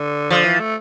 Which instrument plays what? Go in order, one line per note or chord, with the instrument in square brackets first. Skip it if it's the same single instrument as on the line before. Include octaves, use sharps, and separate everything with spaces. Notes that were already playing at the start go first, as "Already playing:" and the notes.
Already playing: [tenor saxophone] D3
[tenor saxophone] D3 [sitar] F3
[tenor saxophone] E3
A3